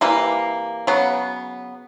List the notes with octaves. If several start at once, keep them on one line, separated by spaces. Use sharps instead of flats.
C3 E3 G3 A#3
C#3 F#3 B3